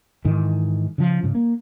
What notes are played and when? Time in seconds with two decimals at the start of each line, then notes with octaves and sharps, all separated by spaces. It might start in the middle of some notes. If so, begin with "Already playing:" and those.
0.25 G#2 D#3 E3
0.98 C#3 F3
1.23 G#2 C#3
1.35 A#3